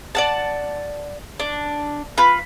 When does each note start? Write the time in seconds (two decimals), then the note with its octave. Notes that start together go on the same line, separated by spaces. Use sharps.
0.15 D5 F#5 A5
1.40 D4
2.18 F4 B4